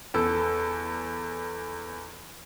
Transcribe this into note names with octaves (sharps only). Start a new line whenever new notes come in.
E2 A4